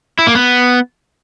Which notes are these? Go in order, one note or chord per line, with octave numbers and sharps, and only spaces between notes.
E4
A#3
B3